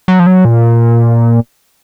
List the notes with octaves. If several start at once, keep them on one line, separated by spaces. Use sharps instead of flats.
F#3
F3
F#3
A#2